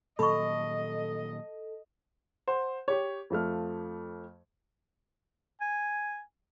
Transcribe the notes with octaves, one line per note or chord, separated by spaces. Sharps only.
A#2 D#3 F#3 A4 D#5 B5 C#6
C5 F#5
G4 C#5
F2 F3 A3 F6
G#5